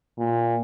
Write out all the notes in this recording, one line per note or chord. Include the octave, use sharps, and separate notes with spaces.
A#2